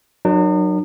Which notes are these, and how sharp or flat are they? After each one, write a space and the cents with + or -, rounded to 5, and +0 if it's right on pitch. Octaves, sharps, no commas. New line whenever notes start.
F#3 +0 D#4 -45 A#4 +0